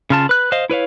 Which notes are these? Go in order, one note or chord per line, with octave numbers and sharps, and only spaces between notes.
C#3 F4 A5
B4 F#6
C5 D#5 F5
E4 B4 C#5 F5